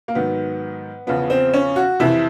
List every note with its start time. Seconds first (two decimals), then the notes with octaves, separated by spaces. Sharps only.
0.08 A#3
0.15 G#2 D#3 F#3 B3
1.07 E2 C#3 F3 B3
1.30 C4
1.53 C#4
1.76 F#4
2.00 F2 C3 E3 E4